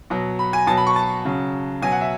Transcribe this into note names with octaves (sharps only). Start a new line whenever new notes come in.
B2 F#3
B5
G#5
B2 F#3 A5
B5
C#6
A5
C#3 F#3
B2 F#3 G#5
F#5
E5